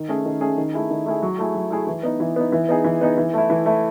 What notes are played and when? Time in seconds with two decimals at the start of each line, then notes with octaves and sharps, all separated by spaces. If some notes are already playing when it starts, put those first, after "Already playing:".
Already playing: D#3
0.09 A3 C#4 G#4
0.25 D#3
0.41 A3 C#4 G#4
0.57 D#3
0.73 A3 E4 G#4
0.90 D#3
1.06 A3 E4 G#4
1.22 F#3
1.39 A3 E4 G#4
1.54 F#3
1.71 A3 E4 G#4
1.87 E3
2.03 B3 D#4
2.20 E3
2.36 B3 D#4
2.52 E3
2.69 B3 D#4 G#4
2.84 E3
3.01 B3 D#4 G#4
3.17 E3
3.34 A3 E4
3.50 E3
3.66 A3 E4